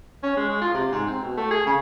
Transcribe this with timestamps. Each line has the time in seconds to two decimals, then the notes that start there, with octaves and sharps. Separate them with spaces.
0.23 C#4
0.37 G#3
0.49 G#3
0.61 F4
0.74 C3
0.92 G#2
1.06 C4
1.22 B2
1.37 A3
1.51 G#4
1.66 C#3